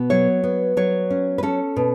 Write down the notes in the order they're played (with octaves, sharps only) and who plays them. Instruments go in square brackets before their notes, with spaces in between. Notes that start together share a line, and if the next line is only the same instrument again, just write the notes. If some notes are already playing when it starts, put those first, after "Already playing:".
Already playing: [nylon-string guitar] B2 B3
F#3 C#5
B3
F#3 C#5
C#4
B4
C#4 A4
B2